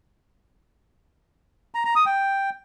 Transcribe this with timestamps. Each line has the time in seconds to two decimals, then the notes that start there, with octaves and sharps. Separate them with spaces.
1.75 A#5
1.85 A#5
1.95 D#6
2.06 G5